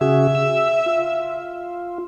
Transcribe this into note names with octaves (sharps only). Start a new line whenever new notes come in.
C#3 F#4 G#4 E5
E6
F4